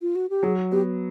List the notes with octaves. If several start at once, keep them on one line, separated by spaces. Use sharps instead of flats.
F4
F#4
G4
F#3 G#4
B3 G4